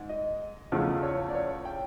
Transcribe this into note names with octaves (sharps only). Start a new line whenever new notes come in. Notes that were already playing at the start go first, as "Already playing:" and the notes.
Already playing: G#2
D#5
E2 C#3 F3 A3
C#5
D5
C#5
G5